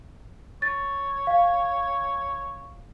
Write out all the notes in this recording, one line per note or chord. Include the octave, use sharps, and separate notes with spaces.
C#5 A6
F5